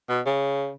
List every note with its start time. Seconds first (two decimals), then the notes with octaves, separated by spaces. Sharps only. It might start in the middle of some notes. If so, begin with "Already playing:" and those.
0.09 B2
0.26 C#3